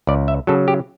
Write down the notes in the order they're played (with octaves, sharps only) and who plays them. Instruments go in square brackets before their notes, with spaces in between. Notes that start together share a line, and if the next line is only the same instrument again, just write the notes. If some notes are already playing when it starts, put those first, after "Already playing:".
[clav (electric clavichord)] C#2 D5
E5
C#3 F#3 A4
G4